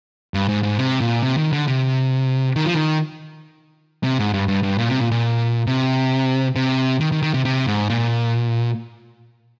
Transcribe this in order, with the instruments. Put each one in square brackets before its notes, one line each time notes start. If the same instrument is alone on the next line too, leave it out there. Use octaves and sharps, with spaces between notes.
[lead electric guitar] G2
G#2
G#2
C3
A#2
C3
D#3
D3
C3
D#3
F3
D#3
C3
G#2
G2
G2
G2
A#2
C3
A#2
A#2
C3
C3
D#3
D#3
D#3
C3
C3
G#2
A#2